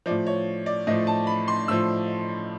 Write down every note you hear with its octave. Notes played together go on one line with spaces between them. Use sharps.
F3 D5
A2
C#5
D5
A2 F3 D#5
A5
B5
C6
A2 F3 E6